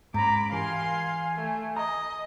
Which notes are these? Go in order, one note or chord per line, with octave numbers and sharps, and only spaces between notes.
G#2 C#4 A#5 B5 D6
E3 G4 A#4 F5 G#5 C6
A3
D#5 A#5